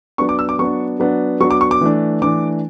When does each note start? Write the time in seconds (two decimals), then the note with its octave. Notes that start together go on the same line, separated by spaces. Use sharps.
0.18 F#3 B3 D4 C#6
0.29 D6
0.39 E6
0.49 D6
0.59 F#3 B3 D4 C#6
1.00 F#3 B3 D4
1.40 F#3 B3 D4 C#6
1.51 D6
1.61 C#6
1.71 D6
1.81 E3 A3 D4
2.22 E3 A3 D4 D6